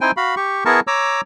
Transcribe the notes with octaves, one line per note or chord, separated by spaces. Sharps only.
C4 D#4 E4 C5 G5 G#5
F#4 F5 B5
G4 C#6
B3 E4 G#4 A#4 A5 C#6
C#5 A#5 D6 E6